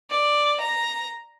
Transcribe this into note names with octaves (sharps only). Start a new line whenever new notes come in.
D5
A#5